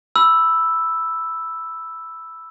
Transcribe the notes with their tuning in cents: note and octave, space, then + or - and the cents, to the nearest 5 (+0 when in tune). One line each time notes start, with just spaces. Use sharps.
B5 +0 E6 +0